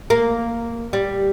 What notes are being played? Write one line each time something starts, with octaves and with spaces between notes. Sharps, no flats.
A#3
G3